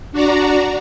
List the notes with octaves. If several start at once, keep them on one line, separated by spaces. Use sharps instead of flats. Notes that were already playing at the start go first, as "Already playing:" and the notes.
D4 F#4 D5 A#5